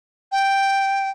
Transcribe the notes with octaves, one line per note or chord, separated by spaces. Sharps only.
G5